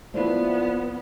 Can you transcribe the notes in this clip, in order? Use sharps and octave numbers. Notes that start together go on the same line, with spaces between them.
F3 A3 B3 E4 D5